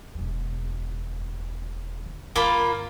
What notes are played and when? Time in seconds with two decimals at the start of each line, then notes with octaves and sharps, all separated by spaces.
0.14 E1 E2
2.06 D3
2.36 G2 D3 A#3 F4 B5